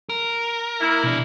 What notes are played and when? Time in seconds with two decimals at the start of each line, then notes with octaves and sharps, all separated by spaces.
0.09 A#4
0.80 A#3 E4
1.04 B2 D4